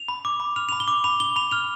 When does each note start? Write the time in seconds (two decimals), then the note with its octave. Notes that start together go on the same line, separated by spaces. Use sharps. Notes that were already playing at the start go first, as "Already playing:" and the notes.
Already playing: F7
0.08 B5
0.25 D6
0.40 B5
0.56 F6 F7
0.69 B5 F7
0.80 G7
0.88 D6
1.04 B5 F7
1.20 D6 G7
1.36 B5 F7
1.51 F6 F7